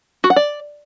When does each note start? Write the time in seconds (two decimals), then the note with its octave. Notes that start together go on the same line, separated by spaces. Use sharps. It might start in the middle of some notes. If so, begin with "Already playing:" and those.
0.24 F#4
0.30 F#5
0.36 D5